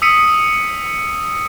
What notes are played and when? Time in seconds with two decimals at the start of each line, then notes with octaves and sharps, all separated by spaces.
0.02 D#6 E6 B6 C#7 D#7